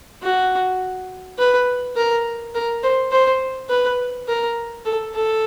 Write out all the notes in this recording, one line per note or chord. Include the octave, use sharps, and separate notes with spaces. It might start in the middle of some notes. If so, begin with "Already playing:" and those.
F#4
B4
A#4
A#4
C5
C5
B4
A#4
A4
A4